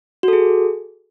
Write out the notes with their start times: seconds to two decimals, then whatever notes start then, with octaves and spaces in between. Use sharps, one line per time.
0.23 F#4
0.28 A4
0.33 G#4